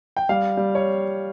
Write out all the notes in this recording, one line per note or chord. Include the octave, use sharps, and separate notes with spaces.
G5
G3 F5
G3
C#5